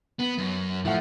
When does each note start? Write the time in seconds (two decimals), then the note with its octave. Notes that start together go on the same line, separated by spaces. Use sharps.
0.19 B3
0.38 F#2
0.85 A2 F3 A3 F#5